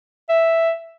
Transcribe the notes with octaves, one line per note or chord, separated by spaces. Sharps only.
E5